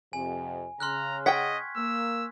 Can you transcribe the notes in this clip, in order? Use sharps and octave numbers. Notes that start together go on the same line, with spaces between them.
F2 C3 G#5
C#3 A#5 C6 F6 F#6
D#5 F#5 G5 C#6 G#6 B6
A#3 E6